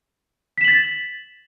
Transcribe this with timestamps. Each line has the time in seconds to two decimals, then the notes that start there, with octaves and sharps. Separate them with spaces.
0.58 B6
0.61 E7
0.64 F#7
0.68 A6